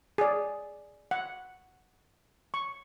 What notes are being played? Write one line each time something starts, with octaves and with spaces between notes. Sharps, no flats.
G#4 D5
F#5
C#6